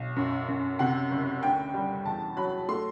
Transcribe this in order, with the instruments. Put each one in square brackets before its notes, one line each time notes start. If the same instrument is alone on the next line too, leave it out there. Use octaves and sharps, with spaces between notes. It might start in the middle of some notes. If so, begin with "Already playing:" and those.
Already playing: [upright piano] B1
F#2
F#2
C3 F#5
F#1
D2 G5
G3
E2 A5
F#3 B5
A3 C6